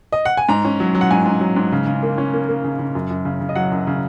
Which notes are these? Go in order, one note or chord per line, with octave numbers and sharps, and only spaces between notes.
D#5
F#5
G#5
G#2 A#5
C#4
F#3
F#3
F#5
G#2 G#5
G#2
F#3
G#2
C#3
C#3
A#3
C#4
A#3
A#3
C#3
C#3
F#2
F#2
C#3
C#3
D#5
F#3 F#5
F#2
C#3